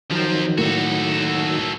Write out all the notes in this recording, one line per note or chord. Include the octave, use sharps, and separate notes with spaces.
D#3 F3 F#3 C4
A2 A3 A#3 F#4 A4